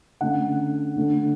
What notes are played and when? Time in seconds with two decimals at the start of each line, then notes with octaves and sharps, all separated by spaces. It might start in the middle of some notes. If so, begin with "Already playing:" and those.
0.21 D3 A3 C#4 F#5
0.96 D3 A3 D4